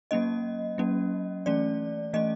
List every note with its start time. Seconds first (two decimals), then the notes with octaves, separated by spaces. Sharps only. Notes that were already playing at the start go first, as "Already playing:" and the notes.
0.11 F#3 A#3 C#4 D#5
0.78 F#3 A#3 C#4
1.46 E3 A3 C#4 D5
2.13 E3 A3 C#4 D#5